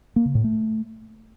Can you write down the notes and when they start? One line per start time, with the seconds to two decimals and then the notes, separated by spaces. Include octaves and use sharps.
0.16 A#3
0.26 C#3
0.35 A2
0.44 A3